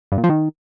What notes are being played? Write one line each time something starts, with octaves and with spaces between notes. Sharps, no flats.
G2
A#2
F3
D#3